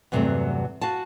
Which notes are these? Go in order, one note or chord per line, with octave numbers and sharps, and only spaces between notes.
E2 G2 C3 F#3 A3 B3
F#4 F5 G#5 A5